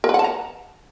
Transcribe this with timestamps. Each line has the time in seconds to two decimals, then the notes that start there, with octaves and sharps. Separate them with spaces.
0.04 A#4
0.09 B4
0.14 F#5
0.19 A5
0.24 A#5